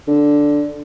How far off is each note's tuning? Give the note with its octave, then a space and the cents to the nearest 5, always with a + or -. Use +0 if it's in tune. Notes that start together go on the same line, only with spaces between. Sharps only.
D3 -5